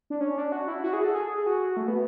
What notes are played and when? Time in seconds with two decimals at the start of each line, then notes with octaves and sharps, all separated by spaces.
0.10 D4
0.21 C#4
0.37 D4
0.52 F#4
0.68 E4
0.84 F#4
0.93 G#4
1.04 A4
1.15 G#4
1.46 F#4
1.77 A3
1.88 B3